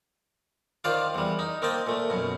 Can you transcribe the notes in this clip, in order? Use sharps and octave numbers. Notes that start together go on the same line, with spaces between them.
D#3 F4 C5 D5 F5
E2 G3
D#4
A#3 C4 D#5 G5 A5
A#2 A3
F#2 B2